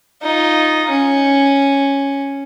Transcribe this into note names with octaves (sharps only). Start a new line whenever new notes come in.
D#4 F4
C#4